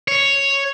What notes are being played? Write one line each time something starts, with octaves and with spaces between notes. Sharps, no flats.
C#5